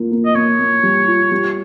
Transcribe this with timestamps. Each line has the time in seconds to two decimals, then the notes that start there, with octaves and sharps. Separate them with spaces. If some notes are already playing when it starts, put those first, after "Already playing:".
Already playing: A#3 F4
0.11 A#3
0.25 D#5
0.35 A#3 C#5
0.59 A#3
0.83 G3
1.07 F4
1.32 G3